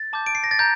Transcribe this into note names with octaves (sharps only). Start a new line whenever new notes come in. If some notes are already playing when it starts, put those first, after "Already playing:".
Already playing: A6
A5 D6 G6
D7
C7
A#6
A6
A#5 G6